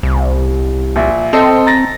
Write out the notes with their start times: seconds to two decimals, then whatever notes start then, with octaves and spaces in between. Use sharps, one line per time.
0.03 C2
0.96 A#1 E5
1.33 C4 A4 D#5
1.66 A#5 A6 A#6